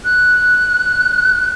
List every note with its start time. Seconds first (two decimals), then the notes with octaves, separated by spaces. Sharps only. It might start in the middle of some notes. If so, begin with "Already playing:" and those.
0.04 F#6